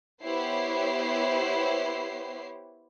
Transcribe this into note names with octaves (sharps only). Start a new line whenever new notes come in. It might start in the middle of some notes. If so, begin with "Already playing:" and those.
B3 E4 G4 C5 C#5 C7